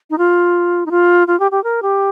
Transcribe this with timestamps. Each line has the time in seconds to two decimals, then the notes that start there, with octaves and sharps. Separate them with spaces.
0.10 D#4
0.18 F4
0.86 D#4
0.91 F4
1.27 F4
1.40 G4
1.51 G4
1.64 A#4
1.82 G4